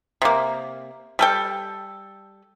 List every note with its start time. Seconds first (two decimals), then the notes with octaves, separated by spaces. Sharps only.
0.22 C3 A#3
1.19 G3 A4 G5